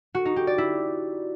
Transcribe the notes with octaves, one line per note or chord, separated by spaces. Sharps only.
F#4
D#4
G4
D5
E4